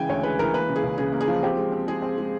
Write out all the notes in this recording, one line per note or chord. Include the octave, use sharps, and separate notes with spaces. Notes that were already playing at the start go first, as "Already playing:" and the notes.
Already playing: C#3 E3 G#3 G5 G#5
D2 C#5
G#3 B4
E3 A#4
A#3 B4
C#3
G#4
C#2
C#3 G#4
A#3
G#4
F3
C4 G4
G#3
C4
G#3 G#4
C4
G#3